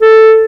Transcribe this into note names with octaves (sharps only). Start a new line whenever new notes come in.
A4